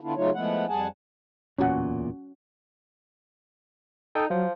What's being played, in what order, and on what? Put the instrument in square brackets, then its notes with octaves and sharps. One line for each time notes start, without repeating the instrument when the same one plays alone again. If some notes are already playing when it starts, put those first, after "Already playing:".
[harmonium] D3 B3 D4 E4 F4
C#3 F#3 A3 D#4 F4 C#5
F3 G#3 A3 B3 E4 F#5
F2 G3 G#4 F#5 G#5 A5
[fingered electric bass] D1 E2 A#2 [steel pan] C#4 F#4 F#5
[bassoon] D#4 [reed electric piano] A4 G5 D#6
[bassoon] F3 [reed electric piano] F#3